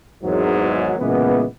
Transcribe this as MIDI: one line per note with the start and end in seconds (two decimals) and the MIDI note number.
0.24 0.94 32
0.24 0.94 40
0.24 0.94 44
0.24 0.94 54
0.99 1.43 46
0.99 1.43 49
0.99 1.43 52
0.99 1.43 56
0.99 1.43 59